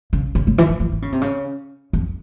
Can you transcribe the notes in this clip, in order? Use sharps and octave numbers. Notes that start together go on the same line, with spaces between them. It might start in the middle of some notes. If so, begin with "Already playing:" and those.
C#3
C#3
C#3
E3
F3
E3
E3
C#3
C3
C#3
F2